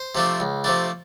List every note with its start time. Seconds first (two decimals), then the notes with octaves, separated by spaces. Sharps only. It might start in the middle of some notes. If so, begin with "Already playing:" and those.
Already playing: C5
0.15 C3 F3 A3 D4
0.40 C#2
0.64 C3 F3 A3 D4